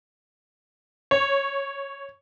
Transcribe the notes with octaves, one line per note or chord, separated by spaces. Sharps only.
C#5